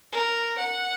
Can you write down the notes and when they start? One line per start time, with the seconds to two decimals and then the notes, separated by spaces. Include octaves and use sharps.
0.12 A#4
0.59 F#5